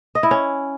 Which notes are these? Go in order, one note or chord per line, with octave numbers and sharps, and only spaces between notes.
D#5
E4
C#4